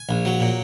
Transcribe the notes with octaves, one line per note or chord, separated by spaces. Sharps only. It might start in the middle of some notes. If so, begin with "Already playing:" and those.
Already playing: G#5
A#1
F#3
A#2